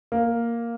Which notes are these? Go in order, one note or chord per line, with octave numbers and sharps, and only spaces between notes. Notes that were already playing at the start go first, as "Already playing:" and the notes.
A#3